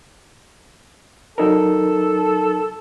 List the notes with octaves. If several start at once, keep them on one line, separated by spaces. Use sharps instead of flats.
F#3 D#4 A4 A#4